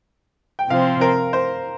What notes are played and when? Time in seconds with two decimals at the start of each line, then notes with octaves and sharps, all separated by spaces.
0.59 G5
0.70 C3 F3 C4 F5
1.01 A#4
1.33 C5